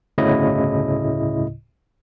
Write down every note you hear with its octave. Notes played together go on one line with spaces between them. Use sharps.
G1 D2 A2 C#3 E4 D#5